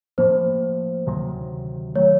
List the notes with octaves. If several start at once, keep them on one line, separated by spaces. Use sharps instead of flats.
A2 F3 A#3 C5
D2 C3 D#3 F#3
D#3 F#3 A3 C#5